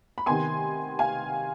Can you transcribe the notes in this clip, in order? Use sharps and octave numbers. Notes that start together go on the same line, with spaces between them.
B5
C3 D#3 B3 G#5 C6
F5 G#5